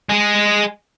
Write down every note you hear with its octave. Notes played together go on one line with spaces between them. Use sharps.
G#3 G#4